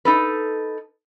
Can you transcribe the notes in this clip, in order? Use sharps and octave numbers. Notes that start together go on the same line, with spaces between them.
D#4 A4 B4